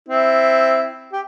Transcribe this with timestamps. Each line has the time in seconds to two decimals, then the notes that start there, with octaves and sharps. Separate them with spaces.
0.08 C4 E4
1.12 G4